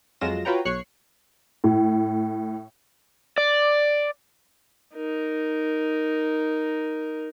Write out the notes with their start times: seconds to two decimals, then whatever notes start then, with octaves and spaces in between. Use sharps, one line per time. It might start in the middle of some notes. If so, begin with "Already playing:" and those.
0.21 F2 F#3 G#3 F4 A#6 E7
0.45 F4 F#4 B4 C#5 G5 A#5
0.65 B1 C#5 C#6 F#6 C7 C#7
1.64 A2
3.38 D5
4.95 D#4 A#4